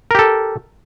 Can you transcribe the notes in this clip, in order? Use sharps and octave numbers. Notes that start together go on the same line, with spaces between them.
G4 A4 A#4